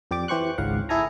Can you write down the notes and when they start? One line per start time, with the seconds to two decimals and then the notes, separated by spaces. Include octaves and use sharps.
0.11 F2 G4 D5 D6
0.28 E3 G4 C5 C#6 F#6
0.58 G#1 C#2 G#2 C#3 F5 F#5
0.89 E4 G#4 A4 G#5 A#5